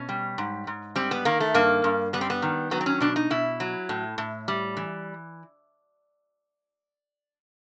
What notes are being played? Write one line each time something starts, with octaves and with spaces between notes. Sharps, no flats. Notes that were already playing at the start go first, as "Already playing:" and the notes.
Already playing: B2 C#4
G3
G#2
G#2
G3 C4
B3
D#3 A#3
A3
G2 A#3
G2
G3 B3
C4
B3
D#3
F#3 B3
C4
C#4
B2 D4
D#4
B2 E4
F#3
A2
A2
G3
E3